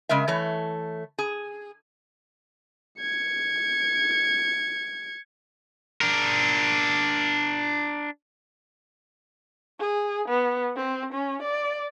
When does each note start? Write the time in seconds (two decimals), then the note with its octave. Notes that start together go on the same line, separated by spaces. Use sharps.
0.09 C#3 G#3 A#4 E5
0.28 E3 A3 C#5
1.18 G#4
3.01 G#6 C#7
6.01 D4 A#4
9.80 G#4
10.29 B3
10.77 C4
11.13 C#4
11.43 D5